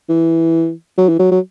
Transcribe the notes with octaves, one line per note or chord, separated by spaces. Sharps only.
E3
F#3
E3
F#3
F#3